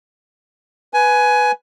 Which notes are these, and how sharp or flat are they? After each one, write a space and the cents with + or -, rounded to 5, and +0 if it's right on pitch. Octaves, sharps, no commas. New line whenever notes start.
B4 +0 G#5 +15